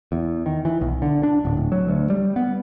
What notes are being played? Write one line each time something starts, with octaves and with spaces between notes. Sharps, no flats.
E2
D#3
E3
B1
D3
D4
D1
D1
F#3
D2
G3
B3